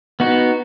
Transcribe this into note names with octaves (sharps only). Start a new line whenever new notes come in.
B3 D#4 F#4